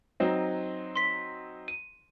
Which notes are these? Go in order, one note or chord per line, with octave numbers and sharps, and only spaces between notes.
F#3 C4 D#4
C6 B6
D#7